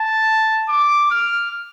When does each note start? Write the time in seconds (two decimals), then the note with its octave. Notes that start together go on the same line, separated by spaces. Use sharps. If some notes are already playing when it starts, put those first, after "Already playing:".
Already playing: A5
0.69 D6
1.11 F6